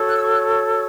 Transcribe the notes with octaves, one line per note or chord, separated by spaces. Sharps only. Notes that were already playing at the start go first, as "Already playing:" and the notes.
Already playing: F#4 A4 C#5
F#6
E6
C#6
F#6